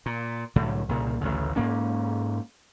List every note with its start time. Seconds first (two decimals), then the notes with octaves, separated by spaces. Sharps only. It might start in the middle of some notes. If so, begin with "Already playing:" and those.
0.06 A#2
0.56 C2 A2 D3 F#3
0.89 C2 A#2 C#3
1.21 A1 D2 C#3
1.56 G#2 A#3 C#4